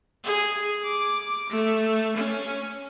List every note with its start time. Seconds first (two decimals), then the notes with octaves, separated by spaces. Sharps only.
0.24 G#4
0.84 D6
1.49 A3
2.17 C#4